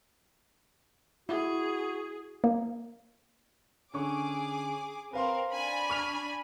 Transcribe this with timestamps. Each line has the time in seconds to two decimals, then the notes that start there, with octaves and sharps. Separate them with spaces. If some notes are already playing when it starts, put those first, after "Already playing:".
1.29 E4 F#4 G#4
2.44 A#3
3.94 D3 C#4 G#4 C#6 D6
5.13 C4 A#4 B4 F5 C6
5.52 D4 G#5 B5
5.90 C#6 F6 F7